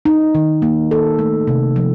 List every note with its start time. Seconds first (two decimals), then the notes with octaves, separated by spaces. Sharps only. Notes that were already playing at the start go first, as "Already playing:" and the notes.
0.05 D#4
0.35 D#3
0.62 A#3
0.91 A4
1.19 A3
1.48 C3
1.76 F3